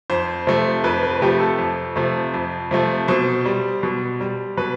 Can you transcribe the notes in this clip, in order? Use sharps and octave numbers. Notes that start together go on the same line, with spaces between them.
F2 C5
C3 F3 A3
F2 B4
B4
C3 F3 A3 G4
A4
F2
C3 F3 A3
F2
C3 F3 A3
B2 C5
G3
B2
G3
B2 B4